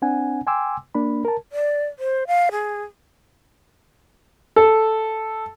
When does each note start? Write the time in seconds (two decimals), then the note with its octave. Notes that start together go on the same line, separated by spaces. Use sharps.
0.02 C4 D4 F#5 G#5
0.47 G5 G#5 C6 D6 E6
0.95 A#3 D4 B5
1.25 A#4 A5
1.52 D5
1.99 C5
2.27 F5
2.52 G#4
4.56 A4